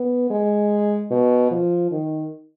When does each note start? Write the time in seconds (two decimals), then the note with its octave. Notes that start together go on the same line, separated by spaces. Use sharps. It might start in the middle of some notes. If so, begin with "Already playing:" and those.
Already playing: B3
0.30 G#3
1.11 B2
1.51 F3
1.91 D#3